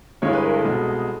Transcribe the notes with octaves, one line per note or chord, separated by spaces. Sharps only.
G1 G2 E3 G#3 C#5
B4
A#4
A4
C2 B2 G#3